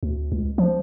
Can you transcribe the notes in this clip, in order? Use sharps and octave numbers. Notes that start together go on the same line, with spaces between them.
D2
C#2
F3